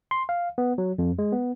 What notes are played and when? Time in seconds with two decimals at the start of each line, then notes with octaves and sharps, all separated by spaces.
0.11 C6
0.29 F5
0.58 B3
0.78 F#3
0.98 F2
1.19 G#3
1.33 B3